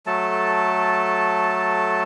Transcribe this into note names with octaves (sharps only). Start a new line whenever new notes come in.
F#3 A3 A4 A5